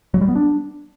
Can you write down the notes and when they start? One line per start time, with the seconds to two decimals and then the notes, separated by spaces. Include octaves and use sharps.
0.14 F#3
0.21 G3
0.28 B3
0.36 D4